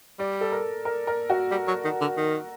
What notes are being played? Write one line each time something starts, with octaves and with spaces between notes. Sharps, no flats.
G3 D5
A4
A#4
A#4
A#4
F#4
G3
F#3
D#3
D3
D#3